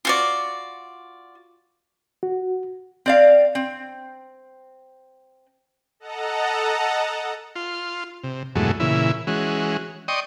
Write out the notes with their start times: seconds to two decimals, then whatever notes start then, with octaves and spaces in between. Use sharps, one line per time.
0.05 F4 F#4 D5
2.23 F#4
3.06 C4 D5 F5
3.55 C4
6.00 A4 D#5 F#5 A5 A#5
7.56 F4 C6
8.24 C3
8.55 E2 G2 B2 F#3 G#3 A3
8.80 A#2 C#3 E3 E4
9.27 E3 G#3 C#4 F#4
10.08 D5 D#5 G5 C6 C#6 D#6